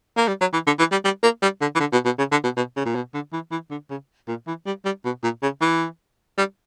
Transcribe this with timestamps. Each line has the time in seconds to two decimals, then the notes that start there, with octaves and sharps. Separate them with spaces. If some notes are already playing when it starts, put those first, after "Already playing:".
0.17 A#3
0.28 G3
0.41 F#3
0.53 E3
0.66 D3
0.79 E3
0.92 G3
1.04 G3
1.23 A#3
1.42 G3
1.61 D3
1.75 E3
1.80 D3
1.93 B2
2.05 B2
2.18 C#3
2.31 D3
2.44 B2
2.56 B2
2.76 C#3
2.85 A#2
2.95 B2
3.14 D3
3.33 E3
3.51 E3
3.70 D3
3.90 C#3
4.28 A#2
4.47 E3
4.66 G3
4.85 G3
5.05 B2
5.23 A#2
5.42 C#3
5.61 E3
6.37 G3